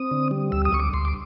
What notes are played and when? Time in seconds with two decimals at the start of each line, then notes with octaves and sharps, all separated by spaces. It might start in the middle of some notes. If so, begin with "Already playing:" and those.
Already playing: C4 D#6
0.11 D3
0.31 G3
0.52 D2 E6
0.65 D#6
0.72 D2 C#6
0.80 D6
0.93 D2 C6
1.05 D6